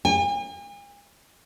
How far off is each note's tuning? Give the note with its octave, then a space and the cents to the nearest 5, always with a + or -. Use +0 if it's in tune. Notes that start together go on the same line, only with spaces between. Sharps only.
G#5 -45